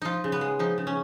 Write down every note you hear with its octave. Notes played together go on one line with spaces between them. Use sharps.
F3 D#4 F4
C#3
B3
G#3
F3 D#4
C#3
C#4